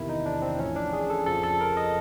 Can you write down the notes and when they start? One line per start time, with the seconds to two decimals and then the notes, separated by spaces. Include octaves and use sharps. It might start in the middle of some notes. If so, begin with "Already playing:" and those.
Already playing: E2 C3 D#3 E4
0.09 D#4
0.26 D4
0.42 C4
0.59 A1 A2 F3 C#4
0.76 D4
0.93 G#4
1.10 A4
1.26 F2 C#3 F3 A4
1.43 A4
1.61 A#4
1.77 D#5